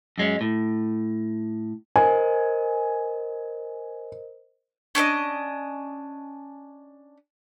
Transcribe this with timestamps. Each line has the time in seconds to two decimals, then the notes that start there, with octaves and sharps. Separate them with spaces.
0.18 F#2 G#3 C#4
0.41 A2
1.96 A#4 C5 D#5 G#5
4.95 C#4 D4 C5 D#5